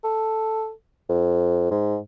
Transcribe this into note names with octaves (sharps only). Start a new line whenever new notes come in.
A4
F2
G#2